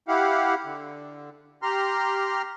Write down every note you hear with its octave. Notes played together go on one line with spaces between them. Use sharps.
E4 G4 F5 F#5
D3
G4 A#5 C6 F6